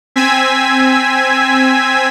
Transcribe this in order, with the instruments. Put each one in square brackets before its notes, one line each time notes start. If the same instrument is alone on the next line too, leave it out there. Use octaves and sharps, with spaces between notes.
[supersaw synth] C4 G#5 E6 G#6 B6